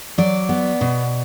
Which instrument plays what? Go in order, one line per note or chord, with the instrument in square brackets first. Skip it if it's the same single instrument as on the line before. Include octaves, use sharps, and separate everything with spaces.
[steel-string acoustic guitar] F#3 D5
B3
B2